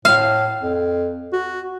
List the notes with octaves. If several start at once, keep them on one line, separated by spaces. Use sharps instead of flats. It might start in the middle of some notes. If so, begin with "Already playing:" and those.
A2 F5
F2
F#4